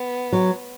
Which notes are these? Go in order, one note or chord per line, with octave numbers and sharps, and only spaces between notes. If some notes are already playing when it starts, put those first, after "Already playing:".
Already playing: B3
F#3